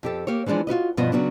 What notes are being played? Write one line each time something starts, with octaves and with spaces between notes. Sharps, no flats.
F2 G4 A4
A#3 G4 C#5
E3 F3 G#3 D4 G#4
F4 F#4 B4 D#5
G2 B2 F3 B3 D#5
C#3 F#3 B3 D4